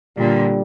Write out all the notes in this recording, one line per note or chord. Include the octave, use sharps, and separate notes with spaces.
A#2 D3 G3